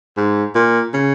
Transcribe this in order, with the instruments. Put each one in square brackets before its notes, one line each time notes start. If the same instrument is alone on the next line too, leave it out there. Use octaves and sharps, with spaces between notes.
[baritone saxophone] G#2
A#2
C#3